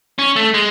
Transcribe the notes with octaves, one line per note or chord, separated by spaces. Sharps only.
C#4
A3
G#3